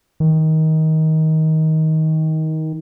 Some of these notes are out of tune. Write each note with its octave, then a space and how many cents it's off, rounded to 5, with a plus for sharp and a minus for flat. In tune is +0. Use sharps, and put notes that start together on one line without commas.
D#3 +20